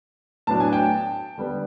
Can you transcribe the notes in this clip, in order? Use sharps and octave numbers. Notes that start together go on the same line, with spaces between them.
A2 F#3 B3 D4 A5
G#5
G5 A5
D3 G3 B3